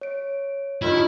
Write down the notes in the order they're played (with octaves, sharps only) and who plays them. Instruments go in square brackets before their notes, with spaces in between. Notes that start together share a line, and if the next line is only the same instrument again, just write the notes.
[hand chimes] C#5 D7
[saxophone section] G2 D#3 [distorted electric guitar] E4 [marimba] F4